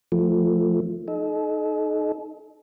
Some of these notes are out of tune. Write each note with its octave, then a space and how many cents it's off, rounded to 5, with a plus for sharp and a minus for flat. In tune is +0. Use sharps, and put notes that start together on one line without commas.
F3 +0 A3 +0
D#4 -10 A4 -45